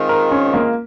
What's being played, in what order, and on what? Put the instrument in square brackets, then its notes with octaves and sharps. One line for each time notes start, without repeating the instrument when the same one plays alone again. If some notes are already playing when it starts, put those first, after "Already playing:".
Already playing: [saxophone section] D#3 G#3 C4 F4
[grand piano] A#4
C#4
A#3